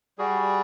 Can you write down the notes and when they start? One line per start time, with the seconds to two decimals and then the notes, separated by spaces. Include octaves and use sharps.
0.18 G3 F#4 G#4